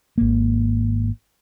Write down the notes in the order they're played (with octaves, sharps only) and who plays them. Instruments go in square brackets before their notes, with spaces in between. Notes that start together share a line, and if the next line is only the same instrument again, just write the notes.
[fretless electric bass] G#1 A#3